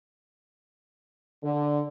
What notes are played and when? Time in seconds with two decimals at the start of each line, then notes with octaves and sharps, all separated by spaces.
1.43 D3